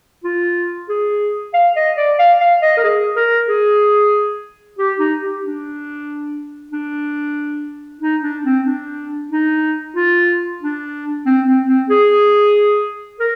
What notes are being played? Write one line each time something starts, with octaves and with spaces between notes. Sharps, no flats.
F4
G#4
F5
D#5
D5
F5
F5
D#5
A#4
G#4
A#4
G#4
G4
D#4
G4
D4
D4
D#4
D4
C4
D4
D#4
F4
D4
C4
C4
C4
G#4
A#4